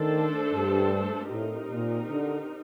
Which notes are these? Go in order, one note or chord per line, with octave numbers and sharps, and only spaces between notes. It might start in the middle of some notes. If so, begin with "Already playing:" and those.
Already playing: D#3 A3 D4 A4 C5
G2
A2 C4 D#4 G4 A#4
A#2
D3